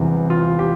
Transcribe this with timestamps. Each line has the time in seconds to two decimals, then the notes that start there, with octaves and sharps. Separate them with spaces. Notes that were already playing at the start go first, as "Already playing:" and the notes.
Already playing: E1 E2 C3 E3 G3
0.30 F4
0.59 G4